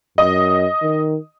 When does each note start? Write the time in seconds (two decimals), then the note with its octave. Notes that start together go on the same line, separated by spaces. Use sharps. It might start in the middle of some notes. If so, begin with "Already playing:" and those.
0.18 F#2 D#5
0.82 D#3